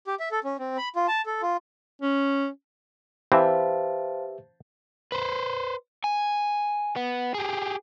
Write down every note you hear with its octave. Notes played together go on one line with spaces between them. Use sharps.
G4
E5
A4
C#4
C4
B5
F4
A5
A4
F4
C#4
E3 C4 G4 B4 C5 E5 F5 A5
B4 C5
G#5
B3
G4 G#4